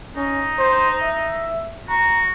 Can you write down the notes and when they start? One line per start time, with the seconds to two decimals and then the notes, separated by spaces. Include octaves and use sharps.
0.16 C#4 D#4
0.59 C5
1.02 E5
1.89 F#4 A#5